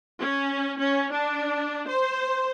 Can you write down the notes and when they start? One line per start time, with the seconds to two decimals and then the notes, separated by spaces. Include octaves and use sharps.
0.20 C#4
0.79 C#4
1.13 D4
1.88 C5